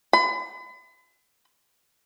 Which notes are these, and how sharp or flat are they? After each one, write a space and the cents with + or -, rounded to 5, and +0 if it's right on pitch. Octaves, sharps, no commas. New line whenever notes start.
B5 +40